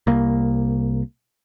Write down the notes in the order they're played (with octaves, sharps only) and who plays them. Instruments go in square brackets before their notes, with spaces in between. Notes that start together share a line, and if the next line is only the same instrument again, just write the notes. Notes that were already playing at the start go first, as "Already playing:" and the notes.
[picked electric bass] C2 A#3